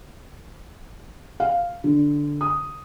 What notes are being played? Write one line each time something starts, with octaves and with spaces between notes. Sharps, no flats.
F5
D3
D#6